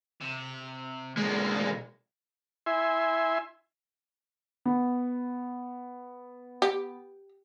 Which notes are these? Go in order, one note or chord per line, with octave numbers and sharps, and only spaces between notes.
C3
B1 G#3 A#3
E4 E5 G#5 C6
B3
G4